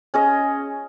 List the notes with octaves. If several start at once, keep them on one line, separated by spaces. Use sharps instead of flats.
C#4 G#4 D#5